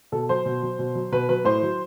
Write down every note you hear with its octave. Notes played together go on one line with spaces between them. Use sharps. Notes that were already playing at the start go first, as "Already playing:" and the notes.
B2 A4
F#3 C5
B2
F#3
B2
F#3
B2 B4
F#3 B4
A2 C5
F#3